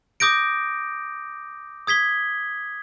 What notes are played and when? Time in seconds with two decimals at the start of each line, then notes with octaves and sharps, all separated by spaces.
0.20 D6 D#6 G6 A#6 D7
1.87 D#6 G#6 B6 G7